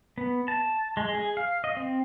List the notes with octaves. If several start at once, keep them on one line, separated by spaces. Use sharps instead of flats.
B3
A5
G#3
G#4
F5
D#5
C4